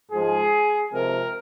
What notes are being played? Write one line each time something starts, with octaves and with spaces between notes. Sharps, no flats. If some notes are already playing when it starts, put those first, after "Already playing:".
G#2 F3 G#3 G#4
C3 F3 G#3 A#4